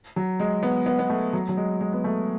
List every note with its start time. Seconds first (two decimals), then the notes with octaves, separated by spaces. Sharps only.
0.16 F#3
0.40 G#3
0.63 B3
0.86 B3
0.99 B3
1.10 A3
1.33 F#3
1.49 F#3
1.57 G#3
1.81 G#3
1.93 B3
2.04 A3